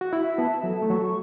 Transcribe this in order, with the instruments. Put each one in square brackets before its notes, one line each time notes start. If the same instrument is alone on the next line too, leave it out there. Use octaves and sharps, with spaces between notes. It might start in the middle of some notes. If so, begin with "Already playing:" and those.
[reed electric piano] F#4
[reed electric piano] E4 [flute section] E5
[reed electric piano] B3 [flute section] A5
[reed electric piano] F#3 [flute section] A4
[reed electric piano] A3
[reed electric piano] F#3 [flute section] C#6